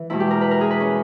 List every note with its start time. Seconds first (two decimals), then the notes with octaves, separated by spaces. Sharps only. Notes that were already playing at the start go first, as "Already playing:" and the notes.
Already playing: E3
0.10 E2 B2 G#3 E4
0.20 G4
0.31 A#4
0.41 B4
0.51 A#4
0.61 G#4
0.70 B4
0.80 C#4